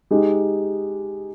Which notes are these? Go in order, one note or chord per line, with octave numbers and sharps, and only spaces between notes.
G#3 D#4 G4